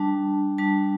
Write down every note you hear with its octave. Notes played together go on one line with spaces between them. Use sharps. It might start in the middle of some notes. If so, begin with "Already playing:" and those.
Already playing: G3 D4 A5
G3 D4 A5